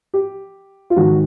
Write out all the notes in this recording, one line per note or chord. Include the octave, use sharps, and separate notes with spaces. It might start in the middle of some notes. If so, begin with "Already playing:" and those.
G4
F4
G#2 D#3 F#4